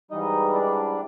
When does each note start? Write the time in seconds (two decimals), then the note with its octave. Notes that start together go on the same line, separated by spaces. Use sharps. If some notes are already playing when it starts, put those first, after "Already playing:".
0.11 G#2 E3 G3 D#4 D#5
0.55 D4 D5